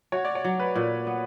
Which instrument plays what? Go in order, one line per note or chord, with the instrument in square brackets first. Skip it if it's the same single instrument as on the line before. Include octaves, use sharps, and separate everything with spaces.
[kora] F#4 [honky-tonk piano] C#5
[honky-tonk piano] D5
C#5
[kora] F#3
[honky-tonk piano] B4
[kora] A#2
B3